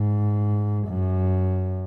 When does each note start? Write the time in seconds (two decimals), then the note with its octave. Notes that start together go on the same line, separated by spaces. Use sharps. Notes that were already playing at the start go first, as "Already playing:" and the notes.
Already playing: G#2
0.88 F#2